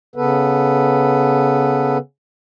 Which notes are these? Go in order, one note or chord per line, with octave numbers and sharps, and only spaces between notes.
C#3 B3 A4 B4